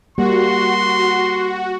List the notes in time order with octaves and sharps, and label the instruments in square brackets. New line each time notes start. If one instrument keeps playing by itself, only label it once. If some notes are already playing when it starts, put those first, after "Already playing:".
[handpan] G3 A#3 [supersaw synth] F#4 [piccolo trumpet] C6